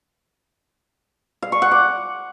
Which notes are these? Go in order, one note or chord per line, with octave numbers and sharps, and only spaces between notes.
F5
C#6
F#5
D6